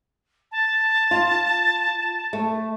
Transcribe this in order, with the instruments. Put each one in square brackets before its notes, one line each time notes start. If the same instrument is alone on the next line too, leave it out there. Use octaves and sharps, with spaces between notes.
[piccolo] A5
[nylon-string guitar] F4
A3